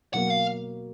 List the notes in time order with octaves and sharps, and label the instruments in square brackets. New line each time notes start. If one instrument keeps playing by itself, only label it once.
[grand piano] B2 F#3 A#3 [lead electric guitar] F#5
[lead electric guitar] F5